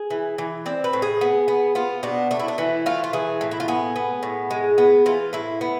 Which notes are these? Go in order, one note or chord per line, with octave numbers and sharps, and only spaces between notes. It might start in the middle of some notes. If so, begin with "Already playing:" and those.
Already playing: G#4
E3
E3
C4 D5
B4
A2
G#4
B3
B3
B3 F4
B2 D4
A3 D4
E4
D4
E3 E4
A3 F4
F4
E3 G#4
A2
E4
F4
B3 G#4
B3
A2
G#3
B3
E3 F4
A2 E4
B3